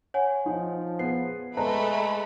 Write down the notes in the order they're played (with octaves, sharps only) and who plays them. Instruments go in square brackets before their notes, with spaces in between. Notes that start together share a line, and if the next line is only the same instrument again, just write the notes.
[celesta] C#5 F#5 G#5
[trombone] F3 [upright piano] D#4
[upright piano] B3 G#4 [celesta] C7
[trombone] G#3 [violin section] A3 A4 B5 [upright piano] B4 D5 A#5